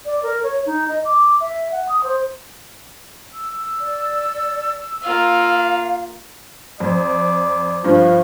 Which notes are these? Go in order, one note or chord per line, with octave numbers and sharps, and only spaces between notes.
D5
A#4
C#5
D#4
D#5
D6
E5
F#5
D#6
C5
E6
D5
A#3 F4 F5
F2 D5
G2 F3